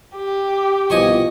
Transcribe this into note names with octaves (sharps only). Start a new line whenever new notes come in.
G4
C2 B2 F3 D#5 G#5 C#6